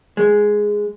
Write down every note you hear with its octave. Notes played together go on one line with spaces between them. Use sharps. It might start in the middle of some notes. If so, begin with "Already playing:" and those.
G#3